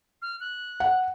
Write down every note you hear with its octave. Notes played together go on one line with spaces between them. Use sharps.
F6
F#6
F#5